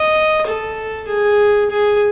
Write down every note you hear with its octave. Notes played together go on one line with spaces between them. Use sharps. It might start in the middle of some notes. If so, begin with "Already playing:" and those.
Already playing: D#5
A4
G#4
G#4